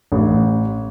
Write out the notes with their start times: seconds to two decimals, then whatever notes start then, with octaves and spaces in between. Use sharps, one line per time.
0.12 A1